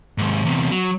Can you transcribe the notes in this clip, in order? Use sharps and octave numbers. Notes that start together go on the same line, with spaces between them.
D#2 G#2
E2 C3
F#3